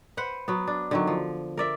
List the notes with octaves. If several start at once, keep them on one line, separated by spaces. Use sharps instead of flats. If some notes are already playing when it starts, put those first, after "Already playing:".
B4 C5 F#5
F#3 B3
D4
D3 D#3 F#3
F3
A#4 D5 E5